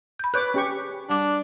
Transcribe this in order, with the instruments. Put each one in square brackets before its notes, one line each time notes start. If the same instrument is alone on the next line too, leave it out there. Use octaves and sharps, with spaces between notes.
[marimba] B5 G6
[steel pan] B4 C#5 D6 [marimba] F#6 G6
[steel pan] C#4 G4 C#6
[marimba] G3 D6 [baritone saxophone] D4